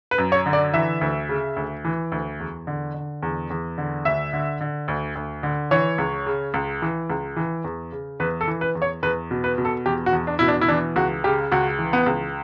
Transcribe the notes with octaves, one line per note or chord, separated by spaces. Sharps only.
B4
F#2
C#5
D3
D5
E3 E5
D2
C#3
D2
E3
D2
E2
D3
D3
E2
E2
D3
D2 E5
D3
D3
D2
D2
D3
E3 C#5
C#2
C#3
C#2
E3
C#2
E3
E2
C#3
E2 B4
A4
E3
B4
E2
C#5
E2 B4
B2
B4
B2
A4
E2 G4
F#4
E2
D4
B2 E4
D4
E4
E3 D4
C#2 F#4
C#3 G4
C#2 F#4
E3
B3
C#2